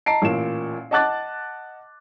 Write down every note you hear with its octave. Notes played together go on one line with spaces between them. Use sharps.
D#5 A5 A#5 C7 D7
A1 A#2 E7
D#5 F#5 A5 D6 F#6 A6